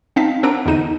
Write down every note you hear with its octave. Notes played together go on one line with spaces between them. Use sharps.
C4 D#4 F5 A5 B6
C4 D4 A#4 F#5 A#5 D7
E2 D3 D#4 D#7